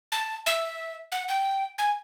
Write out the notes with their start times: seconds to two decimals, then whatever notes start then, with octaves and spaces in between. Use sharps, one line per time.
0.12 A5
0.46 E5
1.12 F#5
1.29 G5
1.78 G#5